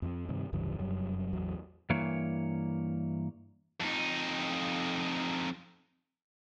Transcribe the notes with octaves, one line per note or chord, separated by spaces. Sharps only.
F2 F3 C4
G2 C3 D#3
F1 C#2 G2 E3
F1 F#2 F#3 G3
A1 E2 F#3
G2 E3 A#3 C#5
F2 D#4